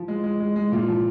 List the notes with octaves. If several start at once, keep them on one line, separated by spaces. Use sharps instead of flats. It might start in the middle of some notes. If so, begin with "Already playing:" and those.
Already playing: F3
G#3
G#3
G#3
G#3
A#2 F4
F3